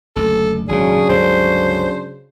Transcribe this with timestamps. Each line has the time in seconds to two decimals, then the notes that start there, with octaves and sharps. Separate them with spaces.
0.16 F#1 D2 A4
0.69 G#1 A#2 C#3 F#3 D4 G#4
1.09 C#2 G2 D3 C5